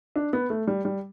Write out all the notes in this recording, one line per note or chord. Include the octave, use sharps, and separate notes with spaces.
D4
B3
A3
G3
G3